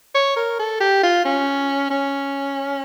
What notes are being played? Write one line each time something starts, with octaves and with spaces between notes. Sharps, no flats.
C#5
A#4
A4
G4
F4
C#4
C#4